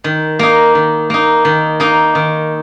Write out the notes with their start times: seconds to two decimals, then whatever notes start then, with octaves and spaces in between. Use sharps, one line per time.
0.04 D#3
0.39 A#3 D#4
0.75 D#3
1.10 A#3 D#4
1.45 D#3
1.80 A#3 D#4
2.15 D#3